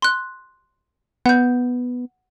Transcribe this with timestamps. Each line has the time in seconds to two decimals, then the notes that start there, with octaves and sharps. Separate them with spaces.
0.02 C6 F#6
1.26 B3 F#5 G6